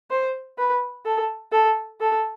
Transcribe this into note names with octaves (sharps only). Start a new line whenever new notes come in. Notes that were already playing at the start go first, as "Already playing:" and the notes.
C5
B4
A4
A4
A4